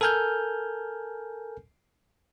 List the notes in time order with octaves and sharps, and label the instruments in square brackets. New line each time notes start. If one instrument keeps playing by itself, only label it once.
[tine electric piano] A4 A#4 G#5 F6 G6